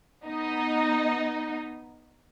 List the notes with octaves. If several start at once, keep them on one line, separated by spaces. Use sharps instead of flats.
B3 D#4 D#5